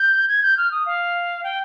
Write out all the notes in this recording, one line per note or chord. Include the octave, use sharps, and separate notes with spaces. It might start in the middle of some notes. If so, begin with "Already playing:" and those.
Already playing: G6
G#6
G6
F6
D#6
F5
G5